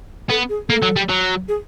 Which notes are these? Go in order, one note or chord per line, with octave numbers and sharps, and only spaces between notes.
B3 A4
G#4
A#3 A4
F#3
G3
F#3
G#4